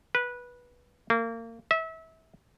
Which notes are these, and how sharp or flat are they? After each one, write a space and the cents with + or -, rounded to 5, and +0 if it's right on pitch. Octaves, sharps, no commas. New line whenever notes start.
B4 -15
A#3 -30
E5 -30